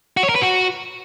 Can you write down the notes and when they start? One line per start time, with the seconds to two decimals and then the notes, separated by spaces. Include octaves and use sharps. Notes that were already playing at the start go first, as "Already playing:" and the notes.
0.17 F#4
0.23 C#5
0.29 A#4
0.35 B4
0.42 F#4